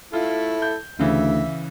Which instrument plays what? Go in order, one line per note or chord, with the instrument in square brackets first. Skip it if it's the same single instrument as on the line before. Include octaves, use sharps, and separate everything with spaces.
[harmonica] E4 A4 [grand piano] F4
[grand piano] G6
[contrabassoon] D2 [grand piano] C#3 E3 [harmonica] E5